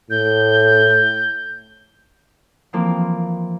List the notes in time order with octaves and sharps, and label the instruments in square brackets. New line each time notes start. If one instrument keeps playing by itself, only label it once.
[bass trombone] A2 [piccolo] G6
[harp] E3 F3 A#3 C4